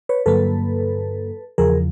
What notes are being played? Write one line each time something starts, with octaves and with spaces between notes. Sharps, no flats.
B4 C#5
G2 D3 F#3 A#3 A4 B4
E2 C#3 F3 G#4 A#4